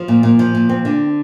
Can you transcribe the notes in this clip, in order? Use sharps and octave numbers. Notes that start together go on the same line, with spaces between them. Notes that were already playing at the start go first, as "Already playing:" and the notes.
Already playing: F3
A#2
A#2
F3
A#2
C4
D3